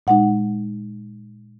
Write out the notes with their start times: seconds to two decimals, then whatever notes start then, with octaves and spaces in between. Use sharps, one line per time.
0.07 A#2 G#3 D#4 F#5